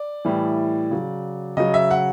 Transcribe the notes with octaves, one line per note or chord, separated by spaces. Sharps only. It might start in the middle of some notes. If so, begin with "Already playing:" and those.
Already playing: D5
A2 E3 G3
C#3 F#3
C#3 F#3 D#5
E5
F#5